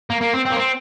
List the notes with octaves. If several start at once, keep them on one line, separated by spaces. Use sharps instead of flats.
A#3
A#3
C4
C4
A#3
C4